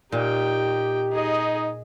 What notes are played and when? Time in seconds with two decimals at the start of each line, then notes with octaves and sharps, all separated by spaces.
0.12 A#2 D#4 G4 G5
1.12 D#4 G#4 D#5